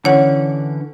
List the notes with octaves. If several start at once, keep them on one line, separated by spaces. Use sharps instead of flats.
D3 E3 C#4 C#5 F#5